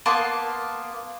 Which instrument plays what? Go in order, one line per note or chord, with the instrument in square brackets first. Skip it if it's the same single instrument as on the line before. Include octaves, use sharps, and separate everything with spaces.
[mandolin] A#3 B3 A5 C6